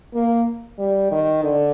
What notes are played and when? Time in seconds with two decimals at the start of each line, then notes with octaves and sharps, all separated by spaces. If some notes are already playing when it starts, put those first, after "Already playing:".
0.14 A#3
0.79 G3
1.11 D#3
1.43 D3